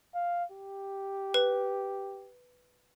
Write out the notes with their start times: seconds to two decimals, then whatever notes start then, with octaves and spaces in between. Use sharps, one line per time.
0.15 F5
0.52 G4
1.34 B4